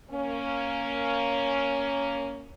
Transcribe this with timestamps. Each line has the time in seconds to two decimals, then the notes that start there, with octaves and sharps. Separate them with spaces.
0.11 A#3 C#4